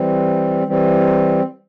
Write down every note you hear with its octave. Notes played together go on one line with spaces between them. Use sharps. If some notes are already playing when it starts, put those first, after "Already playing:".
Already playing: E3 G3 C4
E3 G3 C4